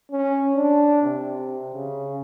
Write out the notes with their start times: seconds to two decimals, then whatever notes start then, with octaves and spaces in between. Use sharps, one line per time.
0.12 C#4
0.56 D4
1.03 C3
1.75 C#3